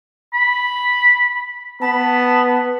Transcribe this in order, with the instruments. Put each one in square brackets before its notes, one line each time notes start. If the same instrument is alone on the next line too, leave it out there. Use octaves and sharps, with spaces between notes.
[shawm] B5
[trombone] B3 [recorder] A5 [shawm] B5